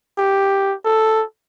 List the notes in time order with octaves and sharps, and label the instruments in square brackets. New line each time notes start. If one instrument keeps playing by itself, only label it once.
[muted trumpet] G4
A4